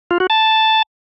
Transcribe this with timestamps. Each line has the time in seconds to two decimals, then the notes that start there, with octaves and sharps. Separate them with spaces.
0.11 F4
0.20 F#4
0.30 A5